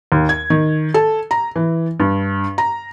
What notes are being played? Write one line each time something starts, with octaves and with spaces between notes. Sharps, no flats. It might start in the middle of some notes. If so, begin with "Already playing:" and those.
D#2
G#6
D#3
A4
A#5
E3
G2
A#5